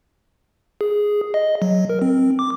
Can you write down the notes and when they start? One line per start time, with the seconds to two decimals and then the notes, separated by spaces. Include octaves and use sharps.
0.81 G#4
1.34 D#5
1.62 F#3
1.90 A#4
2.02 C4
2.39 D6